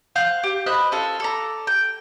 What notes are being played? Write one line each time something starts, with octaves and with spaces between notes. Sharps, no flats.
C5 F5 F#6 G6
G4
C5 D#5 B5 F#6
C#4 F4 A4 A#4
A4 D5 A#5
G5